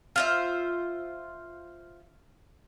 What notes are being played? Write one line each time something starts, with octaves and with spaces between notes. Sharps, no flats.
F4 C5 E5